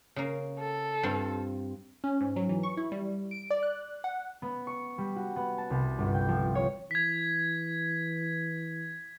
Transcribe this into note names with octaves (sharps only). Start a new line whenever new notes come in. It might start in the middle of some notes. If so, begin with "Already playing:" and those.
C#3 A#3
A4
G2 C4 F4
C#4
G#2
F#3
E3
C#6
E4
G3
D7
D5
F#6
F#5
B3
C#6
G3
F#4
B3
A5
C2
G1
G5
F3
C#5
E3 G#6 B6